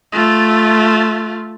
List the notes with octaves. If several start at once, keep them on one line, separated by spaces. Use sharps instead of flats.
A3 F4